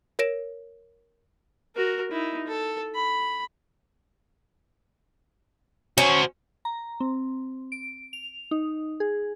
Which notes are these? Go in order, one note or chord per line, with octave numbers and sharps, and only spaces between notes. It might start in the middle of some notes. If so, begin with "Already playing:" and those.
A#4 C#5 A#6 D7 E7
F#4 A#4
D#4 E4
A4
B5
C#4 F#4 C5
A#5
C4
D7
F7
D#4
G#4